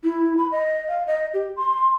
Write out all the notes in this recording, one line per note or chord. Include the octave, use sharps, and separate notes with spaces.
E4
B5
D#5
F5
D#5
G4
C6